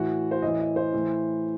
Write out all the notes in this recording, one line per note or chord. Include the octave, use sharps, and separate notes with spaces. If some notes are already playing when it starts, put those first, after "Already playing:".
Already playing: A2 E3 F#4
C5
A2 E3 D#5
D#5
C5
A2 E3